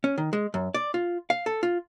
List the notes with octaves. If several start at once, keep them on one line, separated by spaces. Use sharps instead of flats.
C#4
D#3
G#3
F#2
D5
F4
F5
A4
F4